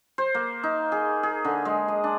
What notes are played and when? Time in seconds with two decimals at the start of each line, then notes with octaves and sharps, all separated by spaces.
0.18 C5
0.35 A#3
0.63 D#4
0.92 G#4
1.23 G#4
1.45 D3
1.65 G#3
1.88 D#5
2.04 D4